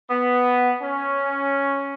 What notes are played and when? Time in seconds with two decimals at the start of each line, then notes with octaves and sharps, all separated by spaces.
0.10 B3
0.81 C#4